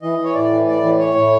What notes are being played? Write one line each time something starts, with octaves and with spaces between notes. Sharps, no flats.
E3 D#5
E3
C#5
A2 D5
E3
A2 D5
E3
A2 C#5
A2